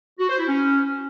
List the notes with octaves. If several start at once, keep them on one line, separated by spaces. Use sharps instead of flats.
F#4
C5
E4
C#4